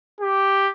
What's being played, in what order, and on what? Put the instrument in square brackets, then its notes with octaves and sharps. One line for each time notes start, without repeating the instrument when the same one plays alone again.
[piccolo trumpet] G4